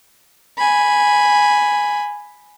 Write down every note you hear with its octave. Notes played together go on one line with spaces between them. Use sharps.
G#5 B5